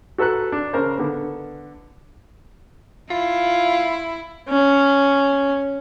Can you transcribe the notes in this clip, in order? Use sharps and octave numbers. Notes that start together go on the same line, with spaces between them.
F#4 A4 B4 A#5 F#6
D4
C#3 A#4 C5
D3 B3
E4 F4
C#4